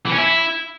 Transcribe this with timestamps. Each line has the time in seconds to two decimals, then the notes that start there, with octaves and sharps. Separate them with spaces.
0.06 E3
0.12 C#4
0.18 E4